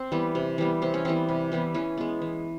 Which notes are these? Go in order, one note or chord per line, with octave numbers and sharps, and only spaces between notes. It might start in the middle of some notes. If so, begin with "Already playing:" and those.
Already playing: C4
E3 G3 B3
C3
E3 G3 B3
C3 C4
C#4
E3 G3 B3 C4
C3
E3 G3 B3
E3 C#4
G#3 B3
E3